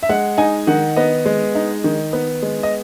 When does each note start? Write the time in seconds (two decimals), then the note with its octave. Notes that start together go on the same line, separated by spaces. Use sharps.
0.03 E5
0.09 G#3 F#5
0.38 D#4 G#5
0.67 D#3 F#5
0.96 B3 D#5
1.26 G#3
1.55 D#4
1.84 D#3
2.13 B3
2.42 G#3
2.63 D#5